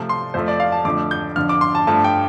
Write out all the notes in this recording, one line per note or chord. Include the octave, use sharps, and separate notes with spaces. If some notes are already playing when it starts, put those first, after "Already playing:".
Already playing: C3 F3 A3
C6
F2 F3 A3 C5
D5
F5
A5
F2 D3 F3 A3 D6
G6
F2 D3 F3 F6
D6
C6
A5
G2 F3 A3 A5
G5